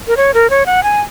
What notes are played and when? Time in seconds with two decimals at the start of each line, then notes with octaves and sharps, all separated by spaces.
0.08 A#4
0.17 C#5
0.34 A#4
0.50 C#5
0.66 F#5
0.83 G#5